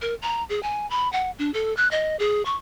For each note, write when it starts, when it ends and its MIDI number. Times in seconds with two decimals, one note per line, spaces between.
0.02 0.15 70
0.22 0.44 82
0.50 0.62 68
0.63 0.88 80
0.90 1.11 83
1.13 1.31 78
1.39 1.51 62
1.54 1.75 69
1.77 1.90 90
1.91 2.16 75
2.19 2.45 68
2.45 2.56 85